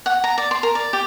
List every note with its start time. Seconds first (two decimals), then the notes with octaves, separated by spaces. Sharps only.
0.06 F#5
0.24 A#5
0.38 D5
0.51 C6
0.63 A#4
0.75 D5
0.93 G4